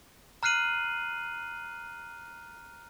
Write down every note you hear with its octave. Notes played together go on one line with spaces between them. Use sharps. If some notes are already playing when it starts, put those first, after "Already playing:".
A#5 F6 F#6 C7 D#7 F#7